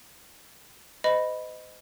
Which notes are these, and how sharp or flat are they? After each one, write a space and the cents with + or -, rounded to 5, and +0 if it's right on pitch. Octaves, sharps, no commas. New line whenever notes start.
C5 -40 D#5 +0 B5 +0